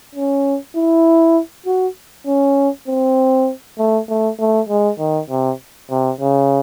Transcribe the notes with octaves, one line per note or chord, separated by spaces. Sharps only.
C#4
E4
F#4
C#4
C4
A3
A3
A3
G#3
D#3
C3
C3
C#3